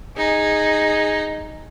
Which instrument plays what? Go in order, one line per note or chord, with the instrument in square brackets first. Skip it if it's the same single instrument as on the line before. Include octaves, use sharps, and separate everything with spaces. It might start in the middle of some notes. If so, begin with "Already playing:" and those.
[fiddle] D#4 [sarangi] G#4